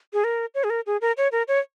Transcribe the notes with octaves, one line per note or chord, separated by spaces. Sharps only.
G#4
A#4
C#5
G#4
A#4
G#4
A#4
C#5
A#4
C#5